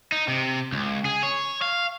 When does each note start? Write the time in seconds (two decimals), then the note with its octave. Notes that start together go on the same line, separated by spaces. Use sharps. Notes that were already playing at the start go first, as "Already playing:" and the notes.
0.12 D#4
0.28 C3
0.72 C#2
1.05 G#4
1.23 C#5
1.62 F5